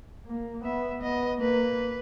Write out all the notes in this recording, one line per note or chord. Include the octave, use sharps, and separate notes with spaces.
A#3
B3 E5
B3 D#5
A#3 B4